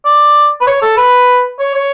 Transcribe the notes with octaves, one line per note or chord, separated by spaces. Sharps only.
D5
B4
C#5
A4
B4
C#5
C#5